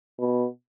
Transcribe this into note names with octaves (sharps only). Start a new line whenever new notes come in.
B2